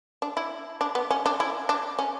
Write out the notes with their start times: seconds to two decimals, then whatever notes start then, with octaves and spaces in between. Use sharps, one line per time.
0.22 D4
0.37 E4
0.81 D4
0.95 B3
1.10 C#4
1.26 D4
1.40 E4
1.69 D4
1.99 C#4